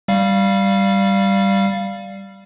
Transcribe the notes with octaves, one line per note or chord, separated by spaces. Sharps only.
G3 F5